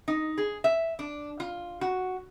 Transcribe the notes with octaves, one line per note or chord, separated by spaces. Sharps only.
D#4
G#4
E5
D4
F4
F#4